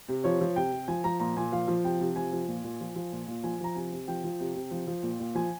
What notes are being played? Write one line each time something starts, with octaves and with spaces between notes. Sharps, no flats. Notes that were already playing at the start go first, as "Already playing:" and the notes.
C3
F3 C#5
F3
C3 G5
C3
F3 G#5
F3 A#5
A#2 A#5
A#2 G#5
F3 F5
F3
C3 G5
C3
F3 G#5
F3
A#2
A#2
F3
F3
A#2
A#2
F3 G#5
F3 A#5
C3 G#5
C3
F3 G5
F3
C3
C3
F3
F3
A#2
A#2
F3 G#5